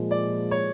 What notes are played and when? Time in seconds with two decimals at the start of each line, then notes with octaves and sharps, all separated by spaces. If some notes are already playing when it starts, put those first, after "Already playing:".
Already playing: A#2 F3 G#3
0.11 D5
0.51 C#5